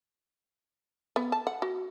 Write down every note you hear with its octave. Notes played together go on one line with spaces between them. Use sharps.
B3
A5
F#5
F#4